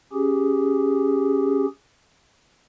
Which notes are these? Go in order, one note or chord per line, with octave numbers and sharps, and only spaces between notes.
C#4 G4 G#4